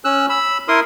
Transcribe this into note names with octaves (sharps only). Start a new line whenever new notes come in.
C#4 E6 F#6
B5 E6
E4 A#4 C6 D#6